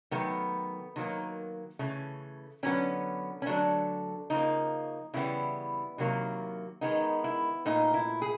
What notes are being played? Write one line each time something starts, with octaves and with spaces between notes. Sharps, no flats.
D#3 F#3 A3 B3
D#3 F#3 A#3
C#3 E3 A3
D3 F#3 B3 C#4
C#4
D3 F#3 A3 D4
C#3 F3 A#3 D#4
C#3 E3 G3 B3 E4
C3 D#3 F#3 A#3
D#3 G#3 B3 D#4
E4
A#2 F3 A3 D#4
E4
G#4